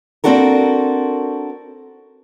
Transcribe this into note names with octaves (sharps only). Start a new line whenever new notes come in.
A#3 C4 D4 F#4 A4 A#4